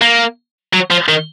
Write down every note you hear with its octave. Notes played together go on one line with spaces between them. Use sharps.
A#3
F#3
F3
D#3